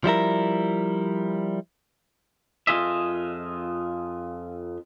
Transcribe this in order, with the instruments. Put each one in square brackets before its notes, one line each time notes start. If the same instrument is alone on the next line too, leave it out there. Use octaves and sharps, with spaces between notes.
[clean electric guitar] F3 G3 E4 A#4
F2 D#3 F4 G#4 D#5 E5